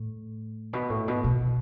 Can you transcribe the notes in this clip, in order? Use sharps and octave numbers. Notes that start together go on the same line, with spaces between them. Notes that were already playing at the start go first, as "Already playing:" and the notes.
Already playing: A2
B2
A2
B2
B2